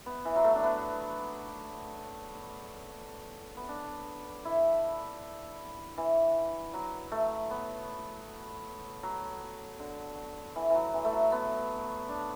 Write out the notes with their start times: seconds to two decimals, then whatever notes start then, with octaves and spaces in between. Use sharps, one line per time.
0.06 B3
0.25 E3
0.36 F#3
0.44 A3
0.55 D4
0.63 B3
3.57 B3
3.69 D4
4.45 E4
5.98 E3
6.74 F#3
7.12 A3
7.51 B3
9.03 F#3
9.80 D3
10.56 E3
10.70 E3 F#3
10.94 E3
11.05 A3
11.13 F#3
11.32 B3
12.09 D4